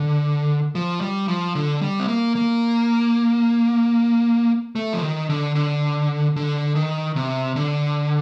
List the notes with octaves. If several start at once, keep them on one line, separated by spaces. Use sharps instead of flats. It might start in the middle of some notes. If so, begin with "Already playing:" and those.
Already playing: D3
F3
G3
F3
D3
G3
C4
A#3
A#3
A3
F3
D#3
D3
D3
D3
D#3
C3
D3